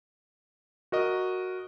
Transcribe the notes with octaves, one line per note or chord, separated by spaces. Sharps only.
F#4 A#4 D#5 D#6